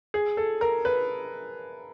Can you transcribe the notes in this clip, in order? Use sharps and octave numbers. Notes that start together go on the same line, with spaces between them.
G#4
A4
A#4
B4